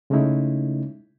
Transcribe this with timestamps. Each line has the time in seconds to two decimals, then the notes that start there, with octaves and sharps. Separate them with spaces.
0.10 C#3 G#3 A3 C#4 D#4 E4